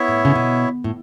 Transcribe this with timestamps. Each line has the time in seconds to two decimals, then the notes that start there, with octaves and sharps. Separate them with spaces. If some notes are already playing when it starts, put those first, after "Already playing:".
Already playing: B3 E4 C#5 E5
0.08 A2
0.25 C#3
0.35 B2
0.84 A2